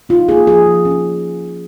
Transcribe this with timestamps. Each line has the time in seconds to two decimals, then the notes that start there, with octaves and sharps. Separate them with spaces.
0.09 D#4 F4
0.28 A#3 G#4
0.47 F3 G#4
0.66 F3
0.85 C#4